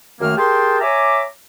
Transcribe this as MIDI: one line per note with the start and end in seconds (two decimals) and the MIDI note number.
0.20 0.35 42
0.20 0.35 51
0.20 0.35 57
0.20 0.35 58
0.20 0.35 89
0.37 0.80 67
0.37 0.80 68
0.37 0.80 70
0.37 0.80 79
0.37 0.80 81
0.37 0.80 84
0.81 1.22 73
0.81 1.22 76
0.81 1.22 80
0.81 1.22 82
0.81 1.22 86